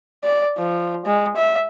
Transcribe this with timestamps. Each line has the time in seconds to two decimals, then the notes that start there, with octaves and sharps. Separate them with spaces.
0.24 D5
0.57 F3
1.06 G#3
1.36 E5